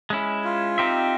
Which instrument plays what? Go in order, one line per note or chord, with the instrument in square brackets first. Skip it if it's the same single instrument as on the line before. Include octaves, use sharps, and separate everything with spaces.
[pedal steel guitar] G#3 C#4 E4
[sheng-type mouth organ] F4
[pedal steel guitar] C4 D#4 G4 C5 E5